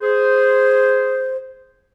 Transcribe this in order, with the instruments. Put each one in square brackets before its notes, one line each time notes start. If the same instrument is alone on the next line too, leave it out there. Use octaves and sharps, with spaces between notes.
[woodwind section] G#4 C5